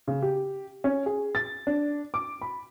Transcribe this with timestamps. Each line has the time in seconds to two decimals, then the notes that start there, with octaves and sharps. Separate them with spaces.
0.08 C#3
0.22 G4
0.84 C#4
1.06 G#4
1.35 A6
1.67 D4
2.14 D6
2.42 B5